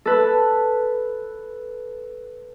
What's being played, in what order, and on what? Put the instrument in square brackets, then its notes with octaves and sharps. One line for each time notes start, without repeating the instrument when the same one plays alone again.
[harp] A4 B4